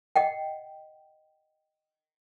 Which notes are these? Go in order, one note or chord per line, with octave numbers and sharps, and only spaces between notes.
D#5 F#5 G5